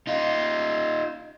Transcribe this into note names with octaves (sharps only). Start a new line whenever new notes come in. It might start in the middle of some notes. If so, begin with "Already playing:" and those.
D#4 F4